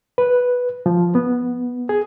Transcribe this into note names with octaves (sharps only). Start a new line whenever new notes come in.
B4
F3
B3
G#4